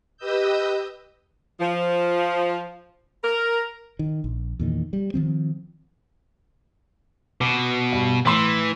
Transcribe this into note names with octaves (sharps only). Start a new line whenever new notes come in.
G4 B4 D#5 D#6 E6 G6
F3
A#4
D#3
A#1
E2 A#2 D#3
G3
D#3 F3 C4
B2 D6
G2
A2 E3 C6 E6